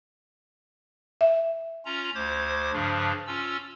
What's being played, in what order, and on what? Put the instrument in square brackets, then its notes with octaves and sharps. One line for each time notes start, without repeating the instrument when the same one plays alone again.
[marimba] E5
[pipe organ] C#4 F4 A#5
D2 C5 D6 G#6
G2 C#3 F3 D4
C#4 F4 E6